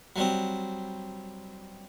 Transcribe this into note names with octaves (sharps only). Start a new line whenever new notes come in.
F#3 G3 C4